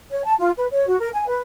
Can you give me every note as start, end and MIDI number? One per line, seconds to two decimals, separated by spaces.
0.10 0.24 73
0.25 0.34 81
0.39 0.50 65
0.57 0.66 71
0.71 0.87 73
0.88 0.97 66
1.00 1.09 70
1.14 1.28 80
1.28 1.41 71